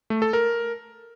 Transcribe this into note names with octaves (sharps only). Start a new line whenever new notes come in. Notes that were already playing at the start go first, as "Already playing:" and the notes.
A3
A4
A#4